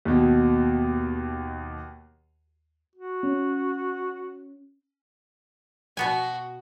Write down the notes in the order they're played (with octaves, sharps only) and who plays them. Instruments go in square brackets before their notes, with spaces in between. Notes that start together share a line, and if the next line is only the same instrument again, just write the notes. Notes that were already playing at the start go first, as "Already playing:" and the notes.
[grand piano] D#2 B2
[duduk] F#4
[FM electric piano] C#4
[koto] B2 B3 G#5 [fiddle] F#4